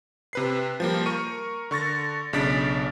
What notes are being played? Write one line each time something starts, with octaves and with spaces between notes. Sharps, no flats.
C3 B4 C7
F3 G3 A#3
A#4 C#6 D#7
D3 C#6 A6 A#6
B1 C#3 D4 A6 B6 D7